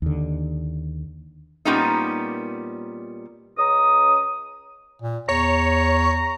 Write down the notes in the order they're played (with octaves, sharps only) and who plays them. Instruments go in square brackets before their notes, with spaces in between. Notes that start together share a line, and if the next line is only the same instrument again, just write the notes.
[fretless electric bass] D#2 D3
[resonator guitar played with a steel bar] A#2 G3 A#3 B3 C#4 D#4
[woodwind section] C#2 C#4 A#5 D#6
[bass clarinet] A#2
[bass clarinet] E2 [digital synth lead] C#5 [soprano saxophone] A#5